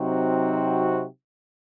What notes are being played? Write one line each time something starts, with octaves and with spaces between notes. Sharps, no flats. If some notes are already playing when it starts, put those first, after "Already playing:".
Already playing: C3 F#3 C4 D#4 F#4